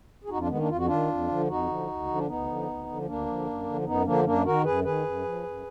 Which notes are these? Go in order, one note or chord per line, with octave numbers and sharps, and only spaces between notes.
G#4
F2 D#4 F#4
D4 F4
D#3 G#3 B3
A#3 D4
F2 F4
F#4
D#3 D4 F4
F2
D3 F3
F2 D#4 F#4
D3 F3
D2
D3 F3
D4
D2 B3 D#4
D3 F3
D2
D3 F3
D2 A#3 D4
D3 F3
F#2
D3 F3
F#2 B3 D#4
D3 F3 A#3 D4
F#2 A#3 D4
D#3 F#4 A#4
F#2 G#4 B4
D#3 G#4 B4
F#2
F3
F#2